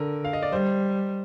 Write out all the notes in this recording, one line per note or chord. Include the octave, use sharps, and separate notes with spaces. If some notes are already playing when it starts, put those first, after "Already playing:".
Already playing: D3 A#4
F5
D#5
D5
G3 C5